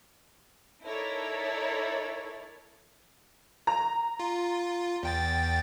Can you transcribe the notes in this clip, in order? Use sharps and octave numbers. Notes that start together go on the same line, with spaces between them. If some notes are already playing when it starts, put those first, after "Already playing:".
D#4 E4 A4 A#4 C#5 D5
A#5
F4
E2 G5 A6